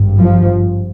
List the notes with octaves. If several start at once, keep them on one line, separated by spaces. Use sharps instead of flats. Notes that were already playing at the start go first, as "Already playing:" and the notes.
Already playing: G#1 G2
F3